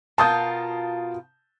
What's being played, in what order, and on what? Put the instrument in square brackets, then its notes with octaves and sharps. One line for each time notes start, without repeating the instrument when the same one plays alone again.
[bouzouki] B2 F4 A#4 [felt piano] A5 D#6 G6